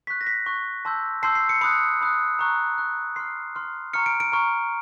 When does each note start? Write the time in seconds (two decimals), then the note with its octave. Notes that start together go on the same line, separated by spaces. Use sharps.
0.07 C#6 F#6 B6
0.21 A#6
0.27 B6
0.46 C#6 F#6
0.85 A5 C6 E6 G6
1.23 A5 C6 E6 G6 C7
1.35 C7
1.49 C#7
1.61 B5 D#6 F#6 C#7
2.01 B5 D#6 F#6
2.39 A#5 C#6 F#6
2.78 A#5 C#6 F#6
3.16 C6 F6 C7
3.55 C6 F6
3.93 A#5 C#6 F6 C#7
4.06 D7
4.20 D7
4.32 A#5 C#6 F6